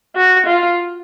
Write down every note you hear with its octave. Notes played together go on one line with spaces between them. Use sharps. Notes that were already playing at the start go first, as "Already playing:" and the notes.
F#4
F4